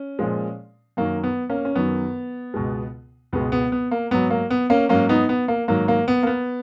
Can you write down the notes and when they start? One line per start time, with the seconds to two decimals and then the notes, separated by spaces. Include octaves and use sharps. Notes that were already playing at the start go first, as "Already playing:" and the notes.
Already playing: C#4
0.19 A#2 F3 G#3
0.97 F#2 D#3 F#3 A#3
1.24 B3
1.49 A#3 C#4
1.65 C#4
1.75 F#2 D#3 F#3 B3
2.54 C#2 B2 G#3
3.33 C#2 B2 G#3 B3
3.52 B3
3.72 B3
3.91 A#3
4.11 G#2 F#3 B3
4.30 A#3
4.50 B3
4.70 A#3 C#4
4.89 G#2 F#3 A#3 C#4
5.09 B3 D#4
5.29 B3
5.48 A#3
5.68 G#2 D#3 F#3 A#3
5.88 A#3
6.08 B3
6.23 A#3
6.27 B3